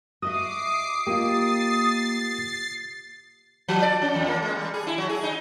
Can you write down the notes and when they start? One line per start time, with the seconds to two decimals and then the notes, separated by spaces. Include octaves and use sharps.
0.22 F#4 D#5 E5 D6 D#6 C7
1.07 A#3 F4 G4 D#5 A6 C7
3.68 F3
3.82 D5
4.02 C#4
4.15 E2
4.28 A#3
4.42 G#3
4.55 G3
4.74 G#4
4.87 E4
4.98 F#3
5.09 G#4
5.23 D#4